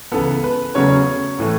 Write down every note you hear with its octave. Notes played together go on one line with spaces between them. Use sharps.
C#2 C#3 E3 B3 A4
B4
E2 C#3 F#3 A3 C#4 C#5
A2 E3 A3